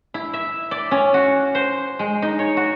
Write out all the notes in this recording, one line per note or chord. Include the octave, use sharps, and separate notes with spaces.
E4
E5
D5
C#4
F#4
C5
G#3
D#4
C#5
F#4